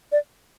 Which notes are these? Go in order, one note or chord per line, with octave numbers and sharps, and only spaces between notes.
D5